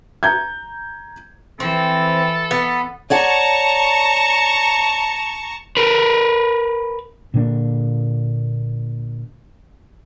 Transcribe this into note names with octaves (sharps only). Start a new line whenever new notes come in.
A#5 G6 G#6
E3 C4 A4
B3
C#5 D5 F#5 A5 A#5 C#6
A#4 B4
A#2 D3 A#3 D4